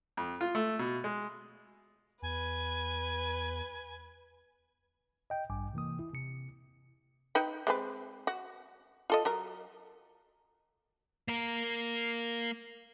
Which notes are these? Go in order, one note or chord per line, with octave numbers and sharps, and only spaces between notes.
F2
F4
A3
B2
G#3
E2 B4 G#5
D#5 G5
A1 G2 G#5 D6
C3 E3 A#3 D#6
E4
C3 C#7
D#4 B4 G5
G#3 C4 B4
F#4
F4 A4 D#5
F#3 A#4 A#5
A#3 A#4